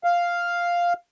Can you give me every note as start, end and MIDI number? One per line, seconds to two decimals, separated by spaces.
0.04 0.93 77